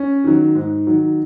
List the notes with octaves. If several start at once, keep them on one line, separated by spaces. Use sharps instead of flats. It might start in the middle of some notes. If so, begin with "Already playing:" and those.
Already playing: C#4
D#3 F#3
G#2
D#3 F#3